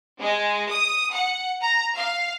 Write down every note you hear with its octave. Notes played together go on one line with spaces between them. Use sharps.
G#3
D#6
F#5
A#5
F5